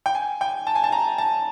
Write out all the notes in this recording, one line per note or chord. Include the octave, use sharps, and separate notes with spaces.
G5
G#5
G5
A5
G#5
A5
A#5
A5